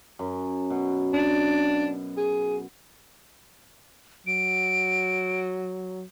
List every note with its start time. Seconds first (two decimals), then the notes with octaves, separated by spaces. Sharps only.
0.19 F#2
0.70 B2
1.13 D4
2.17 G#4
4.27 F#3 D7